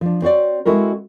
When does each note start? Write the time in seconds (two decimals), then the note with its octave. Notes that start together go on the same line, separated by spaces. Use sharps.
0.01 F3 D4
0.22 C4 F#4 C#5 D5
0.65 G#3 C4 E4 F#4 A4 A#4